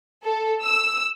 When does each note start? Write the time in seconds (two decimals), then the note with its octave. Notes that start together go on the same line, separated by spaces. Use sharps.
0.25 A4
0.63 E6